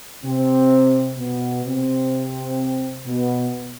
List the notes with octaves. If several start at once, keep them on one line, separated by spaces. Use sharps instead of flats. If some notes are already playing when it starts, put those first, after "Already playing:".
C3 C4
B2 B3
C3 C4
B2 B3